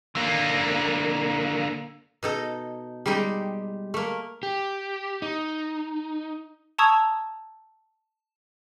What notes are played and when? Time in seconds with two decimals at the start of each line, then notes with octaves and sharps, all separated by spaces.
0.15 D3 A#3
2.23 B2 D#4 A4
3.06 G3 G#3 D#4 G4
3.94 A3 A#3
4.43 G4
5.22 D#4
6.78 A5 A#5 C#6 D#6 E6 G#6